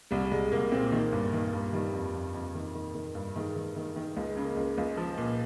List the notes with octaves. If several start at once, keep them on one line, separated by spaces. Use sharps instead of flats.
C2 G3
C2 G#3
C2 A#3
A#2 C4
D#3 A#3
G2
D#3
G2
D#3 G3
F2
F2
F2
D#3
D#3
D#3
G2
D#3 G#3
D#3
D#3
D#3
C#2 G#3
C#3
A#3
C#2
C#2
F3
A#2